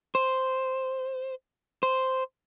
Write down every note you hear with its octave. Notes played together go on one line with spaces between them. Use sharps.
C5
C5